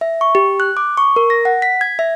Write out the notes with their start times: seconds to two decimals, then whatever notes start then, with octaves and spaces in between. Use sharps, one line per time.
0.01 E5
0.21 C#6
0.35 G4
0.60 F#6
0.77 D6
0.97 C#6
1.16 A#4
1.30 A#6
1.45 F#5
1.62 B6
1.81 G#6
1.99 E5